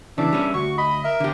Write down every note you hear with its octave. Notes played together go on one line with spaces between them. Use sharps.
C#3 E3 D4 E5
G3 C#4
D2 F#4 C#6
D#5 B5
A#4 E5
D3 G4